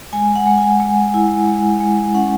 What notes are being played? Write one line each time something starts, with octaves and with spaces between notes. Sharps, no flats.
G#3 G#5
F#5
G#3
G#5
G#3
E4
G#3
G#3
C#4 F#5